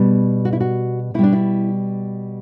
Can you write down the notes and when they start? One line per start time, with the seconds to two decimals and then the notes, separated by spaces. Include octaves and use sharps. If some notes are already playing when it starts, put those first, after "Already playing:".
Already playing: B2 G3
0.45 F#4
0.53 E4
0.60 F#4
1.14 B2 E4
1.19 G3 D4
1.32 E4